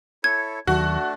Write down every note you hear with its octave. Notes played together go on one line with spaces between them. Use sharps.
E4 A4 C#5 G#6
D#2 D#3 F#3 A3 D4 F#4